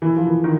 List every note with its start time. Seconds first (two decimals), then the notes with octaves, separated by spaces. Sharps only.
0.02 E3
0.16 F3
0.27 E3
0.44 D#3